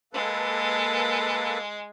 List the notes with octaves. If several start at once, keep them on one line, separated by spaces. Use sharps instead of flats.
G#3 A#3 A4 B4